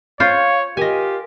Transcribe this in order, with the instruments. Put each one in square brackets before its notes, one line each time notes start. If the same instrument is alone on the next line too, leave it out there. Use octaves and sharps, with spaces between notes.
[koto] F4 C5 [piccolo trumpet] C#5 [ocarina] F5
[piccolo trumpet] F4 [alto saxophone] G4 [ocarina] A#4 [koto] D#5 G#5